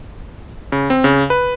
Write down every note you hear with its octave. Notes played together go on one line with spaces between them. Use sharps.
C#3
C4
C#3
B4